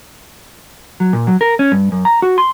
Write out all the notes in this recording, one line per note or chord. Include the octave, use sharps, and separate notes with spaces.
F#3
A#2
F#3
A#4
C#4
G2
F#2
A#5
F#4
C6